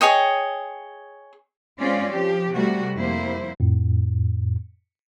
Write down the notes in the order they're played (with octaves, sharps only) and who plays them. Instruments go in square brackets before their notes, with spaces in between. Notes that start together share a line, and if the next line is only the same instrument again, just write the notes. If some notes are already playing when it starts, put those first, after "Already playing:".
[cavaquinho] G#4 C#5 D#5 G5
[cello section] G#3 C4 C#4 F4 D5
F3 G4
C3 G3 A3 F#4
F2 G3 A#3 E4 C5
[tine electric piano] F2 A2